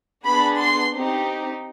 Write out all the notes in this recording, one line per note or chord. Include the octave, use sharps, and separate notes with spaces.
B3 D4 G#4 B5
C6
C4 D#4 G4